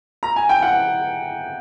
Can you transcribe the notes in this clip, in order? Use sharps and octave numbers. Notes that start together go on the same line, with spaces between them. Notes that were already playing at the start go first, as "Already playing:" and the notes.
A#5
G#5
G5
F#5